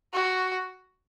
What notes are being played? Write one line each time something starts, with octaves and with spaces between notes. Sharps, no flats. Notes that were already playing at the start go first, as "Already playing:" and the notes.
F#4